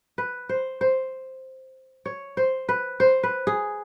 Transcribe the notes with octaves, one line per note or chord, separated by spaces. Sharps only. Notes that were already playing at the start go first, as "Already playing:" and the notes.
B4
C5
C5
C#5
C5
B4
C5
B4
G#4